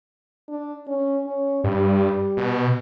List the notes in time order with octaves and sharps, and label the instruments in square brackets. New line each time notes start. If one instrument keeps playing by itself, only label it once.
[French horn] D4
C#4
C#4
[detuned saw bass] G2 [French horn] G3
[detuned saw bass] B2